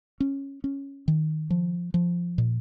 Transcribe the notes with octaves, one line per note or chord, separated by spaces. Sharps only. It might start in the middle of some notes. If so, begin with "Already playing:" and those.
C#4
C#4
D#3
F3
F3
A#2